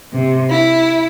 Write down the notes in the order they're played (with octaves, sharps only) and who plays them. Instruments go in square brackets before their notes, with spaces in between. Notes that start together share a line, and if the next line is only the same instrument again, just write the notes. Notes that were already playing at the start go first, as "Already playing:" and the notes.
[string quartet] C3
E4